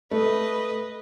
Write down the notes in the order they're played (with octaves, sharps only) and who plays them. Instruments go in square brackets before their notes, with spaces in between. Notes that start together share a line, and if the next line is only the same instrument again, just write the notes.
[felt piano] A3 [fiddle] B4 D#5